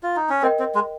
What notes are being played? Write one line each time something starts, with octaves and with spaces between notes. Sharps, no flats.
F4
D#4
C#4
C4 A#4 D#5 G5
C4
G#3